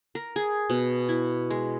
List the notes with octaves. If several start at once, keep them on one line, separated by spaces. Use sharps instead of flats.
A#4
G#4
B2
E4
G#3